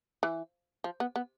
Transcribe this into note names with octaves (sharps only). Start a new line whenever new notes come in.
E3
F3
B3
B3